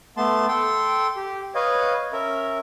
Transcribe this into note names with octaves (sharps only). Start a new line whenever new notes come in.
A3 B3 A5 C6
A4 G5 C6
G4
B4 C#5 D#5 F5
C#4 A#4 E5